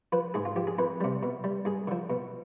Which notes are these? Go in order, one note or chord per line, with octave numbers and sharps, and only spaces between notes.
F3 B4
G#2 G#4
F4
F3 G4
G#4
F2 B4
C3 G3
B2
G3
G2 G#4
D3 F3
B2